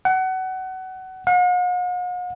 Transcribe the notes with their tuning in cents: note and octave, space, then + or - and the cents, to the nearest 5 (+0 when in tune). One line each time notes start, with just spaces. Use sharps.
F#5 +25
F#5 -45